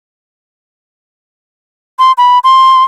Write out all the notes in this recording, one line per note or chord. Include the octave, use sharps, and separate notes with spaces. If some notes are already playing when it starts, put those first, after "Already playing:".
C6
B5
C6